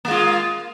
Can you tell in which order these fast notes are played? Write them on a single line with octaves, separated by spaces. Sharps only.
A#3 G#3 F4